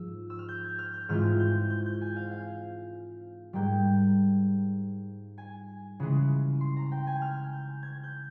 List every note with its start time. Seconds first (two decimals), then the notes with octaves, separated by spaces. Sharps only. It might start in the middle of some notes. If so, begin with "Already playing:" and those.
Already playing: G#2 F3 E6
0.30 E6
0.39 F6
0.48 G6
0.64 G#6
0.79 F6
0.94 G6
1.09 G#2 E3 G#3 C4 F4 F6
1.40 G6
1.70 G6
1.86 G6
2.01 G#5
2.16 F5
2.31 F5
3.53 G#2 G3 A#3 G5
5.38 G#5
6.00 C#3 E3 G#3
6.61 C6
6.76 A#5
6.91 G5
7.07 G#5
7.22 F6
7.53 G6
7.83 G#6
8.04 G6